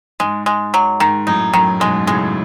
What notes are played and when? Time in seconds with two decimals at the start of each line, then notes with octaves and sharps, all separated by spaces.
0.20 G#2 G#3
0.46 G#3
0.74 F#3
1.00 G#2 D#3
1.27 F#2 A2 D#4
1.53 F#2 A2 D#3
1.80 G#2 B2 G#3
2.07 A2 C#3 G#3